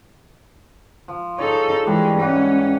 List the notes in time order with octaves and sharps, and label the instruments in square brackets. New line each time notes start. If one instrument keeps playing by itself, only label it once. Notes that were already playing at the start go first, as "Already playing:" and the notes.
[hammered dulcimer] F3
[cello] D#4 A4 [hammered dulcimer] G#4 C#5
[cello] E3 G#3 [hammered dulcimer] G3 D4
[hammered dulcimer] G#2 E3 F#5 [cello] C#4